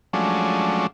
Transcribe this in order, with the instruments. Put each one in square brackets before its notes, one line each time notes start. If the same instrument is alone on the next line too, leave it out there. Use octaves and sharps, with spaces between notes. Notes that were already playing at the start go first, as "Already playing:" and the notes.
[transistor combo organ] F3 F#3 G#3 A3 C#4 D4